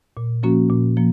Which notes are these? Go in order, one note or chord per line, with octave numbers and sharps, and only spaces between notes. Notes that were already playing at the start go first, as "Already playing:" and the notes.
A#2
F3 A#3 C#4 F#4
A#2
F3 A#3